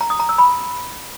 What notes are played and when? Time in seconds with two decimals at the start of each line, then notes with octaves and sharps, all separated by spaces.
0.01 A#5
0.10 D#6
0.20 A#5
0.29 E6
0.38 B5